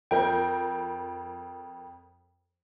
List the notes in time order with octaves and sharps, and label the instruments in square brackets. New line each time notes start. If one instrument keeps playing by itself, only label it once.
[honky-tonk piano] F2 A#4 G6 [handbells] G5